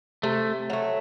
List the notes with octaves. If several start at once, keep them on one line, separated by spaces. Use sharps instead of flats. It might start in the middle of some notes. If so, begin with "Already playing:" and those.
C3 A3
F#3 A3